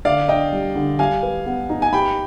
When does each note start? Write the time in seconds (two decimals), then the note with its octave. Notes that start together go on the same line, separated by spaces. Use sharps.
0.05 D3 D5 F5
0.29 D4 D#5 G5
0.52 G3
0.75 D3
0.99 G3 F5 G#5
1.23 B4
1.46 B3
1.70 D#4
1.82 G#5
1.93 G4 G5 B5